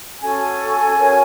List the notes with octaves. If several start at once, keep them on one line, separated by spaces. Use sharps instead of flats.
C#4 F#4 A4 G#5
C#4 F#4 A#4 C#5